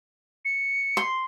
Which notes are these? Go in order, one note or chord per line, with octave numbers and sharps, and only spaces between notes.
C#7
C6